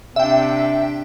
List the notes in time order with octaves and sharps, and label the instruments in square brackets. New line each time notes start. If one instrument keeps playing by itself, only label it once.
[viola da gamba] C3 D4 [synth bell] E5 G5